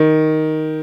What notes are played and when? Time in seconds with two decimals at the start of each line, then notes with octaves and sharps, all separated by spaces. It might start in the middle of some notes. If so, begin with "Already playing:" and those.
Already playing: D#3